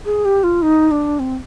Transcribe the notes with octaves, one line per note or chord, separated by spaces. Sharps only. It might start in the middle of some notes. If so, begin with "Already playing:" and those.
G#4
G4
F4
D#4
D4
C4